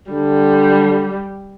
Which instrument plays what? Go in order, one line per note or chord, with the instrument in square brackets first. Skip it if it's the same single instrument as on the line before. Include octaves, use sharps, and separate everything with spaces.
[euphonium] D3 [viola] G3